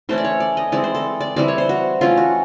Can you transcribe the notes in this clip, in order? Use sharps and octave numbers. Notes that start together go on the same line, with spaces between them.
E3 A3 C#4 C5
D5
C#5
D5
D#5
E3 G#3 C4 D5
C5
A4
D5
E3 G3 C4 D5
C#5
C5
F#4
E3 A3 C#4 F4
F#4